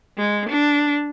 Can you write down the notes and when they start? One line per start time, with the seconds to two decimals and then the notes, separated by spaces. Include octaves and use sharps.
0.18 G#3
0.49 D4